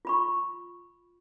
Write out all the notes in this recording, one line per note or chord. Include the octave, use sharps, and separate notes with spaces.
F4 B5 C#6